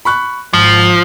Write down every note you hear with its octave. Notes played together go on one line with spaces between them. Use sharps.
B5 C#6 F#6
G#1 F3